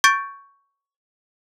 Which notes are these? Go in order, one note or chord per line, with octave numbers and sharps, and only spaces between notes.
C#6 G6 A6 D7